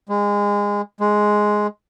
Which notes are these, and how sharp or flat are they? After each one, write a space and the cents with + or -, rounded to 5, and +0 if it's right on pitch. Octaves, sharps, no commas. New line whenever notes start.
G#3 -25
G#3 +5